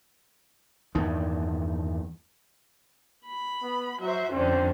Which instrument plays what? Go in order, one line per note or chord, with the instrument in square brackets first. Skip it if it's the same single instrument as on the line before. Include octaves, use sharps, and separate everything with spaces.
[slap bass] E2 G2 D#3
[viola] B5
[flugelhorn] B3
[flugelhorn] F#3 [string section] F#4 C5 [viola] E5
[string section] F2 D3 [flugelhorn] C4 [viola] C#4